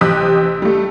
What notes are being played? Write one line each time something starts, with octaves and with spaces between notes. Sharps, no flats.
A1 C3 G4 D#6 F#6 B6
G3 A3